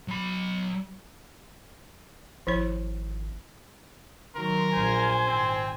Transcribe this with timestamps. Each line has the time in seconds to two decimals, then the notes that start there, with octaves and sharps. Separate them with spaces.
0.08 F#3 B5
2.47 G#1 F3 E4 C#5
4.36 D#3 F#3 A#4 C6
4.74 A#1 C5 G#5
5.27 G#1 C4